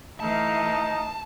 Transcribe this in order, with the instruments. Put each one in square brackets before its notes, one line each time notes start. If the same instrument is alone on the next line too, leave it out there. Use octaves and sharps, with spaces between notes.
[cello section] E3 A3 F5 [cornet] D#4 [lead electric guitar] A5